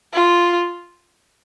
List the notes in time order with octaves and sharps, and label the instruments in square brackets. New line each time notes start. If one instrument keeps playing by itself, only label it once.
[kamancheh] F4